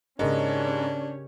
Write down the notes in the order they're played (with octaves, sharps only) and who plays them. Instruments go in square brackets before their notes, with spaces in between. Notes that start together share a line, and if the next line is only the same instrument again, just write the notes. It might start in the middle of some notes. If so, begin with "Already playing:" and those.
[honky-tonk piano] G#2 [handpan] C#3 A#4 D#5 [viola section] C#4 G4 C#5 [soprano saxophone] D4